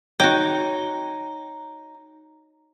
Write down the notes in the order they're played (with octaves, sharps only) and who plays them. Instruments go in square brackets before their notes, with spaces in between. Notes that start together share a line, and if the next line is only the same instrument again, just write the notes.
[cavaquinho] D#4 [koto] F#4 G5 [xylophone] C#5